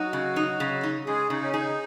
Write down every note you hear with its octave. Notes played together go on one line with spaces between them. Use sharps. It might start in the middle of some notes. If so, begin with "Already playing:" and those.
Already playing: F#3 D#4 F#4
C#3
D#4
C#3
D#4
C#3 G#3 G#4
C#3 D#4
C#4
D#4 G#4